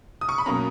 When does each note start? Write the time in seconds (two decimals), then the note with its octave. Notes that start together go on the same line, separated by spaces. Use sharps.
0.21 D#6
0.29 C#6
0.38 B5
0.46 B2 F#3 A#3 C#4 A#5